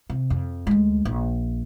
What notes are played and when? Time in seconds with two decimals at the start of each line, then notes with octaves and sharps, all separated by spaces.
0.10 C3
0.30 F2
0.67 D2 G#3
1.05 A#1